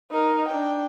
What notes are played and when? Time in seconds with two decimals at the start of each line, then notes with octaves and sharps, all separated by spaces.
0.11 D#4 A#4
0.49 D4 G5